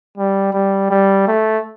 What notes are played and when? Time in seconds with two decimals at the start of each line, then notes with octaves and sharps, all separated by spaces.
0.18 G3
0.53 G3
0.90 G3
1.28 A3